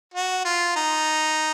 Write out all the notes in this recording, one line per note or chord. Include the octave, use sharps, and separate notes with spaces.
F#4
F4
D#4